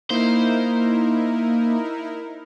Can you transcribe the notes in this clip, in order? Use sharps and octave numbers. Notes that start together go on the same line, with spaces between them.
A#3 D#4 E4 A#4 C5